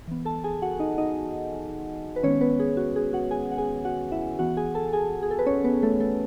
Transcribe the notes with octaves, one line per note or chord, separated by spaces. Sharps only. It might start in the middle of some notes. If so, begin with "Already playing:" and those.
E3 B3
A4 A5
G#4 G#5
F#4 F#5
D#4 D#5
D#4 D#5
B4
D#3 G#3 B3 C#4 C#5
B3 B4
G#4
F#4
G#4
F#4 F#5
G#4 G#5
F#5
G#4 G#5
F#4 F#5
E4 E5
E3 B3 F#4 F#5
G#4 G#5
A4 A5
G#4 G#5
G#4
A4
B4
C#4 C#5
B3 B4
A3 A4
A3 A4